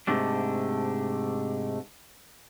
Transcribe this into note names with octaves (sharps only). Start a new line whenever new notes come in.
G#2 C3 A3 D4